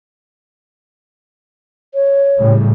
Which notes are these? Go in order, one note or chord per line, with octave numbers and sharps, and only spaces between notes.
C#5
A2 C#3 G3